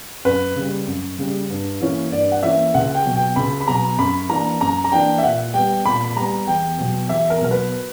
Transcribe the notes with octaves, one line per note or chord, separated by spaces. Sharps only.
F#2 B4
C#3 G3
F#2
C#3 G3
G2
E3 A#3 C#4 E4
G2 D5
F#5
E3 A#3 C#4 E4 E5
C#2 F#5
G5
B2 F#3
G5
C#2 B5
B5
B2 F#3 A#5
F#2 B5
E3 A#3 D4 A#5
F#2 A#5
A#5
E3 A#3 D4 G5
E5
A#2 F#5
G3 B3 G5
A#2 B5
B5
G3 B3 A#5
E2 G5
B2 F#3
E2 E5
A#4
B2 F#3 A#4
B4